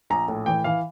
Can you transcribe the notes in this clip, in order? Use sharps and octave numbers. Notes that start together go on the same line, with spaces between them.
A#1 A#5
A2
E3 G5
E3 F5